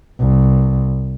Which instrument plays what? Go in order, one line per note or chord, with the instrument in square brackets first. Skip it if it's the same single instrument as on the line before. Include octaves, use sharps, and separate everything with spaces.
[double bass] C2